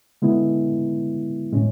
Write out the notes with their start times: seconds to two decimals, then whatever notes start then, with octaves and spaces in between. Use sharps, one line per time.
0.22 D3 G#3 B3 E4
1.52 A2 G#3 C#4